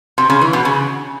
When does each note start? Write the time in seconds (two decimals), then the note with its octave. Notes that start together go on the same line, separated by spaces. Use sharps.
0.18 C3
0.30 C#3
0.41 E3
0.53 B2
0.65 C#3